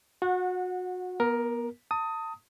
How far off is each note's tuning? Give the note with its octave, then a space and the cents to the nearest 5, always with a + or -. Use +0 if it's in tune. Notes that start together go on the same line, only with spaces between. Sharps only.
F#4 -30 F#5 -15
B3 -30 A#4 +10
A5 +35 D#6 +15